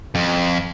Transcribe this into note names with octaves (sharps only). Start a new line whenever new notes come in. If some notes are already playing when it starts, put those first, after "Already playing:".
F2